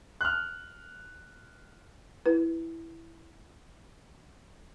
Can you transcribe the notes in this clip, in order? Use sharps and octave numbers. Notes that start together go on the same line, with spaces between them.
F6 F#6
E4 B4